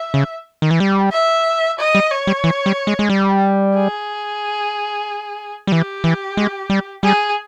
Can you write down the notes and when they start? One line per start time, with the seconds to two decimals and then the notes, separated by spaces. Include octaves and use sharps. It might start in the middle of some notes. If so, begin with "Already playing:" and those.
Already playing: E5
0.14 C#3
0.62 D#3
0.71 E3
0.80 G3
1.12 E5
1.79 D#5
1.95 G3
2.11 C#5
2.27 G3
2.44 E3
2.66 G3
2.87 G#3
2.99 G#3
3.10 G3
3.76 G#4
5.67 G3
5.72 E3 G4
6.04 E3
6.37 G#3
6.70 G3
7.03 G3 G#4